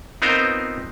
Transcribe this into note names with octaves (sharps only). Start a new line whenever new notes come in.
B3 C4 D#4 F4 A#4 C5